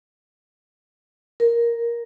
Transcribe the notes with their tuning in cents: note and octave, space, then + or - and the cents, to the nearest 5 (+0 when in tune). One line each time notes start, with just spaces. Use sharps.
A#4 +5